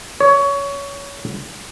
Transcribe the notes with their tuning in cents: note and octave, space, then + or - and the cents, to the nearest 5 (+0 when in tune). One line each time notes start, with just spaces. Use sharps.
C#5 +20